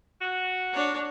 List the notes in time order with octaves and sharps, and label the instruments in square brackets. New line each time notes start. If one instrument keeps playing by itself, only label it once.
[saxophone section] F#4
[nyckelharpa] D4 C#5